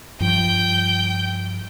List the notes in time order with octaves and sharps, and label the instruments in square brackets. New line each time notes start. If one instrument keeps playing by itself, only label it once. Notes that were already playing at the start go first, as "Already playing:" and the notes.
[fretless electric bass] G2 F3 [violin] G5 G6